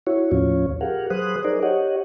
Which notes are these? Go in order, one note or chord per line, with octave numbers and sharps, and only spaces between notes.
E4 F#4 C#5
D#2 A2 F3 C#4 F4 C#5
G4 G#4 A#4 F5 F#5
F#3 G#4 B4 C5 D#6 F#6
D#4 G#4 A#4 C5 D5
G4 C#5 D#5 F#5